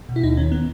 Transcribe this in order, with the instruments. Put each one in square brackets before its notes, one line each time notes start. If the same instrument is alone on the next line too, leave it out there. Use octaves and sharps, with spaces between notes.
[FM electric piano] B2
E4
D#2 D#4
D#3 C#4
B3